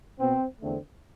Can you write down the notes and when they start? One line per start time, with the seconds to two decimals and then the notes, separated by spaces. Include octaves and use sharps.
0.19 B2 B3 C4
0.61 E2 D3 A3 C4